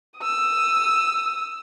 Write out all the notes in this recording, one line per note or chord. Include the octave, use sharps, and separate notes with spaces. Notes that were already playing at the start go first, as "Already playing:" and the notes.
D#6 E6